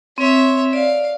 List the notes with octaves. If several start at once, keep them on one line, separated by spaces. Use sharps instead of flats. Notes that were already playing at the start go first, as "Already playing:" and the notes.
C4 C#5 E5
D5 F5